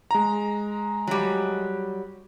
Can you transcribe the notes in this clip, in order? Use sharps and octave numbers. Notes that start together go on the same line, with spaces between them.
G#3 A#5
F#3 G3